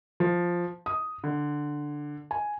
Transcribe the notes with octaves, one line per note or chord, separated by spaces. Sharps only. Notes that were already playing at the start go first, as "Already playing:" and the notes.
F3
D#6
D3
G#5